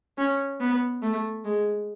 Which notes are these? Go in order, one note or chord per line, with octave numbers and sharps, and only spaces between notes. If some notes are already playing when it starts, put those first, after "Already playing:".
C#4
B3
A3
G#3